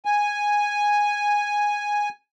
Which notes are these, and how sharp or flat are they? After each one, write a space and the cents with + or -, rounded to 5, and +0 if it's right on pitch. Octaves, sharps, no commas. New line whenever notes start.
G#5 -5